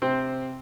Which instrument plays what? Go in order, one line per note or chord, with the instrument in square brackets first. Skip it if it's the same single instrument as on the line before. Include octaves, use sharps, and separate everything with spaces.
[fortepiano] C3 C4 C5